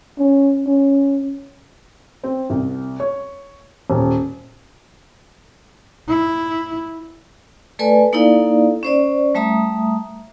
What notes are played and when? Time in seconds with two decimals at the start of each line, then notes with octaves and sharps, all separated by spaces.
0.19 C#4
0.67 C#4
2.23 C4
2.50 C2
3.00 C#5
3.90 D#1
6.08 E4
7.79 A3 A4 B4 D5 G#5
8.13 A#3 D#4 E4 A4 D5 F5
8.83 C#4 C5 D5
9.35 G3 A3 E5 A#5 D#6